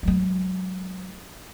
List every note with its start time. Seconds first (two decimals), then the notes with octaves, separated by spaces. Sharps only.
0.03 F#3 G#3